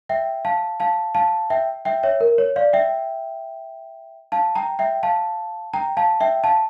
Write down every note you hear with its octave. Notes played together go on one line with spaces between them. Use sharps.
E5 G5
F5 A5
F5 A5
F5 A5
E5 G5
E5 G5
C#5 E5
A#4
C#5
D5 F5
E5 G5
F5 A5
G5 A#5
E5 G5
F5 A5
G5 A#5
F5 A5
E5 G5
F5 A5